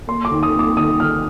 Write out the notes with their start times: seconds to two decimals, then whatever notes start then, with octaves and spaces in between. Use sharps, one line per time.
0.07 A#3 C6
0.25 D6
0.32 D#2
0.43 D#6
0.54 A#3 D6
0.77 D#3 D#6
0.99 D#2 F6